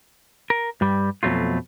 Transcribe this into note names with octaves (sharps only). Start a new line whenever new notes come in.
A#4
G2 G3
F2 B2 F#3 A3 F4